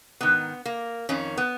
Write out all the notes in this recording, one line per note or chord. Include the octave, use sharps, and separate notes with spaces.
G#2 D#3 B3
A#3
F2 D#3 C#4
B3